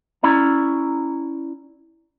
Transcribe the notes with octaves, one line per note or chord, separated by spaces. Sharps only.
C#4 E4 D5 A#5